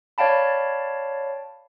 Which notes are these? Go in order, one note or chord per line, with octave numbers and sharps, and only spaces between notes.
C#5 D5 F5 G5 A5 B5